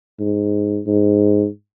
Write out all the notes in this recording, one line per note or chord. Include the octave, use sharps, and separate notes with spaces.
G#2
G#2